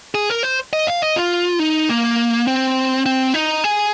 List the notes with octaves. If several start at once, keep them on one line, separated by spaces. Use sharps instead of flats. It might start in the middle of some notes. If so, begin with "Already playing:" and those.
G#4
A#4
C5
D#5
F5
D#5
F4
D#4
A#3
C4
C4
D#4
G#4